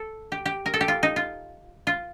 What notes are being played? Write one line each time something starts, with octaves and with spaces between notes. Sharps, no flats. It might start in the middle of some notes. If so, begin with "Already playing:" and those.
Already playing: A4
G4
G4
A#4
A4
G4
F4
D#4
F4
F4